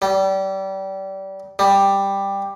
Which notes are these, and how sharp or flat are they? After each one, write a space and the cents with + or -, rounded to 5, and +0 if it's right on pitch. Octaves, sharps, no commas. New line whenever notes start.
G3 -25
G3 +10